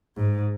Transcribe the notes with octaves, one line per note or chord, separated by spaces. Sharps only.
G#2